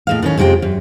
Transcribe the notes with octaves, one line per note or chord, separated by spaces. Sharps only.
A2 G#3 F5
A2 D#3 C#4
F2 C3 G#3 G#4 G5
F#2